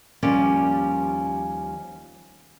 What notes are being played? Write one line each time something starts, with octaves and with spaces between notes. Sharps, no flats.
D#2 F3 G3 C#4 D5